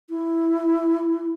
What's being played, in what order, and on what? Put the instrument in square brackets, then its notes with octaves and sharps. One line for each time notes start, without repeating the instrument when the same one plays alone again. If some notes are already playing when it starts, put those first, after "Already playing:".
[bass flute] E4